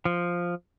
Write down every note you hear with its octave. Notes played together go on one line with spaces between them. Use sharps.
F3